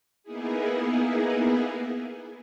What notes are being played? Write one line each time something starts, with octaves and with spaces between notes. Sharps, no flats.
A#3 B3 D#4 E4 G#4